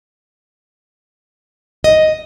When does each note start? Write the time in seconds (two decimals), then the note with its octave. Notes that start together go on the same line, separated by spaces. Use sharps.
1.84 D#5